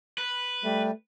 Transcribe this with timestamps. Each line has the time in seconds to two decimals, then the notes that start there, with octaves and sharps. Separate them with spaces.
0.18 B4
0.64 G3 A3